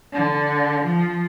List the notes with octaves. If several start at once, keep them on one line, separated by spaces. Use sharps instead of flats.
D3
F3